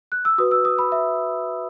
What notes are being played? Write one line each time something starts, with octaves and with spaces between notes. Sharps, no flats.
F#6
E6
F#4 B4 D#6
E6
D#6
B5
E5